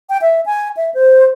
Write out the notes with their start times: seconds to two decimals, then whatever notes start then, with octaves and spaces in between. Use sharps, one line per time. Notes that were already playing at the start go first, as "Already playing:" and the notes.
0.10 G5
0.22 E5
0.46 G#5
0.77 E5
0.94 C5